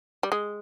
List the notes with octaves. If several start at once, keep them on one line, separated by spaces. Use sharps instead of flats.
G3
G#3